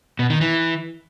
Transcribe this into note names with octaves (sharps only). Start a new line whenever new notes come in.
B2
D#3
E3